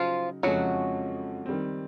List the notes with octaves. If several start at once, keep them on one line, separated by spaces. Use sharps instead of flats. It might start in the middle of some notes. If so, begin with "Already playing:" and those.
Already playing: C#3 F3 F#3 D#4 F4
F2 C#3 F3 F#3 G#3 F#4
D#3 G3 C4